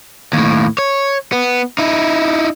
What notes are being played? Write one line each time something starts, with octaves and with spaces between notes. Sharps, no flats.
D#2 A2
C#5
B3
D#4 E4